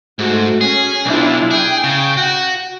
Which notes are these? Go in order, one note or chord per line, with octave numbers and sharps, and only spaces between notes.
G#2 A3 F#4
C#4 G#4
B1 D4 E4 F4
G#4 G5
C#3
F#4